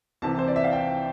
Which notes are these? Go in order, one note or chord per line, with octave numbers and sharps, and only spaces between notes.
C2 C3 E3 A5
C5
D5
E5
F5
G5